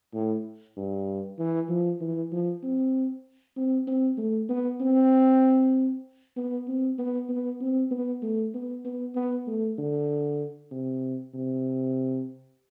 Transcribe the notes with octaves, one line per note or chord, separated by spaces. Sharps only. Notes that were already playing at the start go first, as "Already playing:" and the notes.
A2
G2
E3
F3
E3
F3
C4
C4
C4
A3
B3
C4
B3
C4
B3
B3
C4
B3
A3
B3
B3
B3
A3
D3
C3
C3